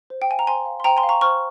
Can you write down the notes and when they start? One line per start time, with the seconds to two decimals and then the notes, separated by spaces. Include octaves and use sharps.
0.10 C5
0.22 G5
0.29 F5 G#5
0.39 A#5
0.47 C5 G#5 C6
0.65 F5
0.80 C6
0.84 C5 G5 A#5
0.97 G#5 C6
1.03 F5
1.09 A#5 C#6
1.21 C5 C#6 F6